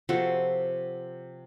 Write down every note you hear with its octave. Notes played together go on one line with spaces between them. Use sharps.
C3 F3 F#4 A4